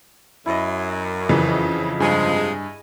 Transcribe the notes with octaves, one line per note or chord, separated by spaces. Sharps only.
F#2 E4 D#5
F2 C#3 E3
G2 C3 F3 G#3 G#4 D#5